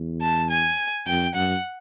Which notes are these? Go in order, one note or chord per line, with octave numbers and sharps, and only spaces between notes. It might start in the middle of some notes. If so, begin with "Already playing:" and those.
Already playing: E2
A5
G#5
F2 G5
F#2 F#5